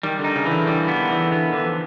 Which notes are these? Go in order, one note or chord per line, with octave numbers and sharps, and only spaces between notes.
D#3 G3
D3
D#4
C#3
E3
D3
D3 G3
B3
D#3
E3
D3 B3
D#3
D3
E3
F3